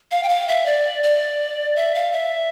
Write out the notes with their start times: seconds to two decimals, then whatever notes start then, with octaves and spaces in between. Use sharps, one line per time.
0.11 F5
0.23 G5
0.29 F5
0.48 E5
0.66 D5
1.03 D5
1.76 E5
1.95 F5
2.12 E5